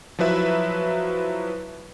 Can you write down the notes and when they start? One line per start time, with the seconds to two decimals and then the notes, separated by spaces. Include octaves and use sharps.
0.19 F3 F#3 E4 B4 E5